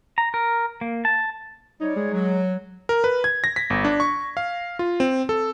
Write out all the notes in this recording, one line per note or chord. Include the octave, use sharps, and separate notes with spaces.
A#5
A#4
A#3
A5
G3 D#4 C#5
G#3
F#3
A#4
B4
G#6
A#6
B6
G1
D4
C#6
F5
F4
C4
A4